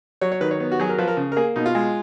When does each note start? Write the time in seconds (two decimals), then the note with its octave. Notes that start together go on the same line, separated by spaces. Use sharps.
0.21 F#3 C#5
0.32 C#5
0.41 D#3 B4
0.51 C#5
0.60 B3
0.72 F#4
0.80 F#3 G#4
0.89 A#4
0.98 F3 B4
1.08 A#4
1.17 C#3
1.32 A#4
1.36 A#3 G#4
1.56 B2 D#4
1.66 F4
1.75 G#3